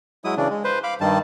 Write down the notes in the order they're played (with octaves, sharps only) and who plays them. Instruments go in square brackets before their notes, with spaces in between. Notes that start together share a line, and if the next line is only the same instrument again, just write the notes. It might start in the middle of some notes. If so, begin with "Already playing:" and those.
[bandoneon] F#3 G#3 E4 D#6
C#3 E3 D4
G#3
B4 C5
F5 B5 D6
G2 D#3 G3 A5